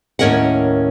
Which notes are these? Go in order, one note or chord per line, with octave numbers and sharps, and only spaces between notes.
D#2 A2 C#4 A#4 D#5 F#5